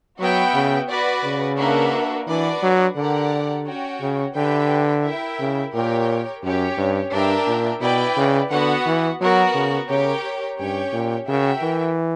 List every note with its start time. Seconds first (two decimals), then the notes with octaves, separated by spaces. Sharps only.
0.20 F#3 B3 F#4 B4 E5 G5
0.54 C#3
0.88 F#4 B4 D5
1.24 C#3
1.58 A#3 D4 F#4 B4 E5
2.27 E3 D4 F#4 B4 D5
2.63 F#3
2.96 D3 G4 A#4 D5 F#5
3.66 C#4 F#4 C#5 G5
4.01 C#3
4.35 D3 G4 B4 E5 G5
5.04 E4 A#4 E5 G5
5.39 C#3
5.73 A#2 G4 A#4 C#5 G5
6.43 F#2 C#4 G4 C#5
6.77 G2
7.12 G2 D4 A#4 E5 G5
7.47 A#2
7.81 B2 E4 B4 D5 G5
8.17 C#3
8.50 D3 B3 F#4 B4 F#5
8.86 E3
9.20 F#3 B3 F#4 A#4
9.54 C#3
9.89 C#3 G4 A#4 C#5 G5
10.58 G2 C#4 G4 C#5 G5
10.93 A#2
11.28 C#3 F#4 A#4 E5 G5
11.62 E3